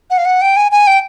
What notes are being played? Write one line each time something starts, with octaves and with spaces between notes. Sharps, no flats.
F#5
F5
F#5
G5
G#5
G#5
G5